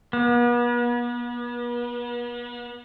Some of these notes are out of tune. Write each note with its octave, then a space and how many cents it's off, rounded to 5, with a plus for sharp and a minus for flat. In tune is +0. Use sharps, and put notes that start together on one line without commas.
B3 -40